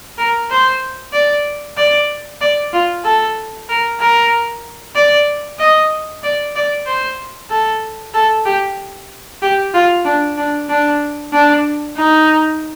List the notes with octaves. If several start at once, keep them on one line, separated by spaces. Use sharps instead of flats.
A#4
C5
D5
D5
D5
F4
A4
A#4
A#4
D5
D#5
D5
D5
C5
A4
A4
G4
G4
F4
D4
D4
D4
D4
D#4